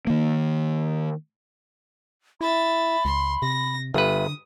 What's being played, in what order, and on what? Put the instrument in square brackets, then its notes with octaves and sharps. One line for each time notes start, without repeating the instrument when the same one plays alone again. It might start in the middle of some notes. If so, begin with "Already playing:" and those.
[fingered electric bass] D#3 A#3
[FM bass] E4 [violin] E5 A6 [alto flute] B5
[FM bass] C#2 [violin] C6
[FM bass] C3 [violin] A#6
[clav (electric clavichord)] G1 B4 [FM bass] D3 [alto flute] E5 [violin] D#6